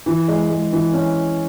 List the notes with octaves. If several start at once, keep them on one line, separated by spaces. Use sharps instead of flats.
E3
G#3
G#3
E3
C#4